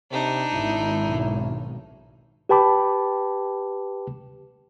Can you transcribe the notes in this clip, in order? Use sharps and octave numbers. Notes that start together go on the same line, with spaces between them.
C3 D4 D#4
G#1 E4
B1
G4 B4 G5 A5 B5 D6